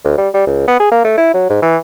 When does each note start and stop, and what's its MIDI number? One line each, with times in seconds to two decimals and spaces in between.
0.04 0.14 38
0.18 0.29 55
0.34 0.43 55
0.47 0.65 37
0.68 0.79 59
0.80 0.91 68
0.91 1.04 58
1.05 1.17 57
1.17 1.33 64
1.34 1.47 54
1.50 1.58 44
1.62 1.77 52